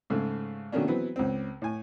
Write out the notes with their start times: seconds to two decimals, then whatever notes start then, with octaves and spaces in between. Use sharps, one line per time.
0.10 G#2 C#3 A3
0.72 B2 D#3 A3 A#3 C#4 D4
0.87 E3 F#3 B3 C4 B4
1.16 C#2 C4
1.62 A2 G#5